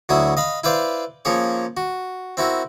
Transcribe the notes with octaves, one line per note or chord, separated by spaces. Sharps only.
D2 F#3 E4 F#4 D#6
D#5 F5 B5
E4 B4 C5 D5 F5
F3 A#3 C#4 G#4 C#5
F#4
C4 E4 F#4 A#4